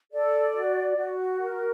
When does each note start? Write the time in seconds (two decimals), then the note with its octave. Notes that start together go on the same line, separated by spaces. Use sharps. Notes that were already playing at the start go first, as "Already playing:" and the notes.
0.12 A4 D5
0.55 F#4
0.96 F#4
1.39 A#4